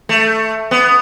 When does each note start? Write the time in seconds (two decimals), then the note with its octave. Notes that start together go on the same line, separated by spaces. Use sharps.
0.09 A3
0.71 B3